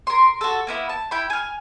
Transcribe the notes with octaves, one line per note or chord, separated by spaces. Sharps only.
A#4 C6
F#4 A4
A#3 B3 E4
A5
E4 G5 B5
G#5 F6